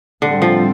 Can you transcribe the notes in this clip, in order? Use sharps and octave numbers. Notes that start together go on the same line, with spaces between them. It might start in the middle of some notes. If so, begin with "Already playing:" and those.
A2 D3 G3 C4
F3